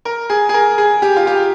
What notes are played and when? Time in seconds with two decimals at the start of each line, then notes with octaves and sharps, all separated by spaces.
0.05 A#4
0.30 G#4
0.49 G#4
0.54 A#4
0.78 G#4
1.02 G4
1.16 F4
1.27 G4